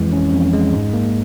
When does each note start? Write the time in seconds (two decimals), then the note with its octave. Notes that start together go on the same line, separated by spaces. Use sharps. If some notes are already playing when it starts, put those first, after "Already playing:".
Already playing: F2 E3 G#3
0.12 C#4
0.33 F2
0.53 G#3
0.73 G#2
0.93 A#3